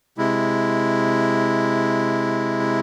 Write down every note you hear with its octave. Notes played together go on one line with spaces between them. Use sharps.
C3 G#3 E4